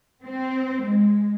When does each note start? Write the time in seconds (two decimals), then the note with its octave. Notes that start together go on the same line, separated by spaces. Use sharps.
0.23 C4
0.84 G#3